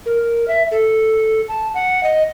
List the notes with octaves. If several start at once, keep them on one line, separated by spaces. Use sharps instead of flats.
A#4
E5
A4
A5
F#5
D#5